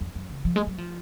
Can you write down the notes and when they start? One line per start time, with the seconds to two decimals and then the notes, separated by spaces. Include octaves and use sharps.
0.01 F2
0.15 F#2
0.30 C#3
0.45 F3
0.56 G#3
0.67 F#3
0.78 F3